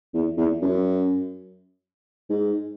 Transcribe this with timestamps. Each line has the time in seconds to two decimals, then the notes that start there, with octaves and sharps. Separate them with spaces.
0.14 E2
0.37 E2
0.62 F#2
2.30 G#2